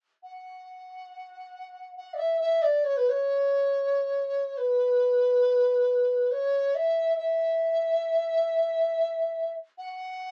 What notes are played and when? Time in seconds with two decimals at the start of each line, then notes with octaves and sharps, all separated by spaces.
0.23 F#5
1.97 F#5
2.14 D5
2.18 E5
2.41 E5
2.62 D5
2.84 C#5
2.97 B4
3.09 C#5
4.57 B4
6.31 C#5
6.75 E5
7.18 E5
9.78 F#5